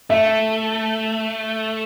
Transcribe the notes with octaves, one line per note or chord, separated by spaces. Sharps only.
A3 E5